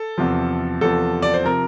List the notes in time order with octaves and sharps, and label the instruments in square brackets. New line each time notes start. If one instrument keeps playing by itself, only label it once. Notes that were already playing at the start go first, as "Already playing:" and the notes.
Already playing: [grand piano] A4
E2 C3 F3
E2 C3 F3 A4
D5
C5
C3 F3 A#4